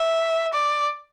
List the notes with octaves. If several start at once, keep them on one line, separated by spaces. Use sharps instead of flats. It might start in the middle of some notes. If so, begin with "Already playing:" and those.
Already playing: E5
D5